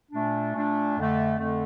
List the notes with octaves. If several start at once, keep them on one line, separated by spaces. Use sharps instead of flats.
A#2 A3 D4
A#2 A3 D4
F2 D3 A3
F2 D3 A3